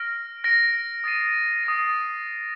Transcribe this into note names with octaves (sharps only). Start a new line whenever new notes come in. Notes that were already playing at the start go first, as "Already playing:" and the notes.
Already playing: F6 A#6 D7
F6 A#6 D7
D#6 A6 C7 D#7
D#6 A6 C7 D#7